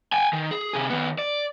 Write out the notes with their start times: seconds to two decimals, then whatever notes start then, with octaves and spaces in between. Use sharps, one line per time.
0.13 G5 G#5
0.33 D#3
0.51 G#4
0.73 C3 G#4
0.90 D#3 B3
1.18 D5